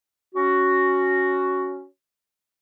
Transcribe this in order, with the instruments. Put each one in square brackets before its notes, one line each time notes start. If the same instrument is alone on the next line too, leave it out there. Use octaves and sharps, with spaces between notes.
[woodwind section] C#4 F#4